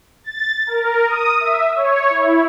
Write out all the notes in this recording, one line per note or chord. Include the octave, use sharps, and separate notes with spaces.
A6
A#4
D#6
E5
C#5
E4